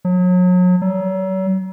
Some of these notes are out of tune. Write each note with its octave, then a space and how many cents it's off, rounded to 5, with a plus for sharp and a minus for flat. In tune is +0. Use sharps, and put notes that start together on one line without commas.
F#3 -35
F#3 +40